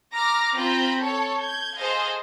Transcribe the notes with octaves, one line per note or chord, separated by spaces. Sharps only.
A#5 D6 F6 A#6
C4 F4 A#5 B5 G6
A4 C#5
G6 G#6
G#4 A4 C5 D#5 F5